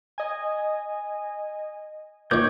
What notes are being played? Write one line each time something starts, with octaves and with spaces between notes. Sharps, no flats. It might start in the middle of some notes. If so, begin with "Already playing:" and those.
D#5 G#5
A#2 D#3 C#5 D6 G6